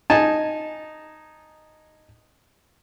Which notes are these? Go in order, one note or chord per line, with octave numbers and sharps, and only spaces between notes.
D#4 G#5 A5